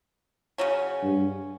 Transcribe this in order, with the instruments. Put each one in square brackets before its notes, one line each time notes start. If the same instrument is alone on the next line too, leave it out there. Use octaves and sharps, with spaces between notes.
[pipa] C#3 F#3 C#4
[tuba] G2